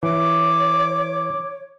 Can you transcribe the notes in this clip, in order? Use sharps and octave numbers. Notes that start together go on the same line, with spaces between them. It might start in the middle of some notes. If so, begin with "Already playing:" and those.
E3 C#5 D6